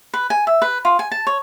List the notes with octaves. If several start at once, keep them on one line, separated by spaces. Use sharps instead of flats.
B4
G#5
E5
B4
F4
G#5
A5
C#5